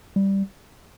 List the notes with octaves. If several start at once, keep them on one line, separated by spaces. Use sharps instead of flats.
G3